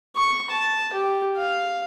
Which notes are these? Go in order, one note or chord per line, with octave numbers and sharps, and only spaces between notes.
C#6
A5
G4
F5